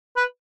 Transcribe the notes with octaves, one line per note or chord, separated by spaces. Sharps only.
B4